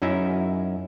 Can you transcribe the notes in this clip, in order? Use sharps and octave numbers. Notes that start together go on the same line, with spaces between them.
F#2 C#4 D#4 E4 E5